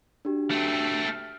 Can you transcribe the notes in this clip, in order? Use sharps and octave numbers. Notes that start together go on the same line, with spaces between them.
D4 F#4 G4
A3 C4
F6